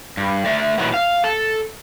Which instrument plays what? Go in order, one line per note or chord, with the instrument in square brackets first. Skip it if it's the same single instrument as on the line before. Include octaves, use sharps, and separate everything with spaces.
[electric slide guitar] G2
A3 D5 E5
A#2 D#3 E3 F#3 B3
F5
A4